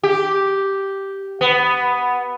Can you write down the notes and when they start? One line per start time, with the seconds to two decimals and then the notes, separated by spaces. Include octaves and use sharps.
0.03 G4
1.41 B3